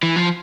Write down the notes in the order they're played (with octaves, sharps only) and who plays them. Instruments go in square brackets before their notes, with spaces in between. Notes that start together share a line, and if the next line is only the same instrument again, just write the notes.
[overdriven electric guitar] E3
F3